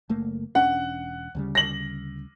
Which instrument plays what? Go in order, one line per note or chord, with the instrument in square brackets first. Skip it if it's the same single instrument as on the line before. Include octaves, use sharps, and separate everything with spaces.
[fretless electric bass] F#1 A3 A#3
[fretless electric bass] E1 C#4 D4 [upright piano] F#5
[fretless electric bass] D2 C#3 G3
[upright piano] A#6 F#7